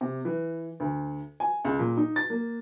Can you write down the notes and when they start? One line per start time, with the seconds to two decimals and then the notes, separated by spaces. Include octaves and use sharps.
0.01 C3
0.25 E3
0.80 D2
1.40 G#5
1.65 C#2
1.79 A#2
1.97 D#4
2.16 A6
2.30 A#3